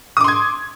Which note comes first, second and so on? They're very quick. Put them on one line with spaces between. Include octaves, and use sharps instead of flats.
D#6 D6 C6 G#6